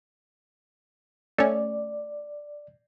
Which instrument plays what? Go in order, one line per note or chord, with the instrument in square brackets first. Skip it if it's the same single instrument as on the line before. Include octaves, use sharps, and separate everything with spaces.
[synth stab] A3 C#4 [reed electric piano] D5